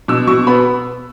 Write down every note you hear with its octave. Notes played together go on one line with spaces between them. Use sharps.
B2 E6
B2 C#6
B3 B5